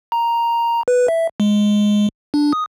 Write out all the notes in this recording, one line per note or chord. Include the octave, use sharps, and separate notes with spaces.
A#5
B4
E5
G#3
D4
D#6